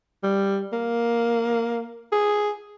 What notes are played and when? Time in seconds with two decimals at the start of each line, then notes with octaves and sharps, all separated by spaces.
0.23 G3
0.73 A#3
2.12 G#4